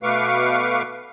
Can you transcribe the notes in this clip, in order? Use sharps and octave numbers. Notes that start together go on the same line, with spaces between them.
B2 A3 B4 F5 C#6 D6